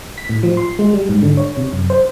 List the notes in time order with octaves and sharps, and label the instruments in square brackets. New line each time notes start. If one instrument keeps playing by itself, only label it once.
[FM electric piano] B6
A2
F3
C6
G#3
G3
G#2
D3
C#5
C3
F#2
C5